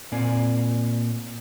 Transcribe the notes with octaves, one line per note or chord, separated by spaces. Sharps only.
A#2 A#3 C4 D5 G#5